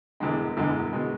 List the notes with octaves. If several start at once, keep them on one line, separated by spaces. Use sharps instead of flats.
E1 E2 D3 G#3
E1 E2 D3 G#3
B2 G#3